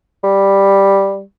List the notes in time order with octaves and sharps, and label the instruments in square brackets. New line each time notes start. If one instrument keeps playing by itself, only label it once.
[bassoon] G3